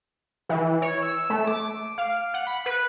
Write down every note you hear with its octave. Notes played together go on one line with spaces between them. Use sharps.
E3
C#5
E6
A3
D6
F5
F#5
B5
B4